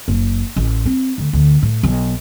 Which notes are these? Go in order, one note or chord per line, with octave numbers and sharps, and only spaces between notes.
F#1
A1
C4
D2
D2
A2
B1